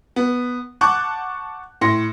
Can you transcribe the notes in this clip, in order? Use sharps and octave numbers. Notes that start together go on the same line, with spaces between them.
B3
F#5 A5 C#6 D6 F#6 G6
A2 C6 A#6 C#7